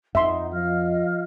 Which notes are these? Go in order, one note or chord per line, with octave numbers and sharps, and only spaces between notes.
F2 D#4 E5 F#5 C6
F3 D#5 F5 F6